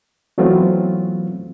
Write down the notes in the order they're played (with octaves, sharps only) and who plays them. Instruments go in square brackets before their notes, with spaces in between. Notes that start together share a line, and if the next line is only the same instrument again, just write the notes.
[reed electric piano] E3 F#3 A3 B3 C4 F4